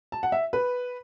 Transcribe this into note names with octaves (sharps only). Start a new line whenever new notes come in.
A5
F#5
E5
B4